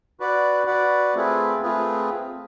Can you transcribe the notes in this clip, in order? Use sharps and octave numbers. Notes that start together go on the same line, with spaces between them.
F#4 B4 D5 F#5
F#4 B4 D5 F#5
A3 C4 F4 G#4 B4
A3 C4 F4 G#4 B4